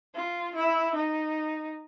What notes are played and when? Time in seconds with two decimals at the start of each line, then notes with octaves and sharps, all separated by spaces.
0.15 F4
0.55 E4
0.95 D#4